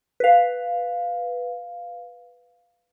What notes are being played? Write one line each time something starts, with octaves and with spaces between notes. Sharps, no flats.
B4 F5